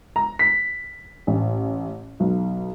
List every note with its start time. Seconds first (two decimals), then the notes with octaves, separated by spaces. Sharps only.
0.16 A#5
0.39 B6
1.27 A1
2.20 B1